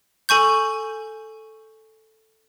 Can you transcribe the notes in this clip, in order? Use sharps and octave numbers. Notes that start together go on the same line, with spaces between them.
A4 G#5 C#6 G6